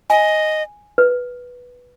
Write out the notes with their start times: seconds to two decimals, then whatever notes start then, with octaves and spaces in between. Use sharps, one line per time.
0.10 D#5 G#5
0.98 B4